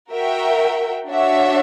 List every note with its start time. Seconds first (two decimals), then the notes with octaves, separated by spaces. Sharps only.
0.12 F#4 A#4 E5 G5
1.09 D4 F#4 C#5 E5